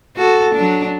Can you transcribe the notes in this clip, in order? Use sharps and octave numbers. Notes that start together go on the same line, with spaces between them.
F#4 A4
F#3 D4